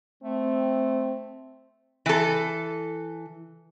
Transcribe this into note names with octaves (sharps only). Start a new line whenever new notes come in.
A3 C4
E3 A4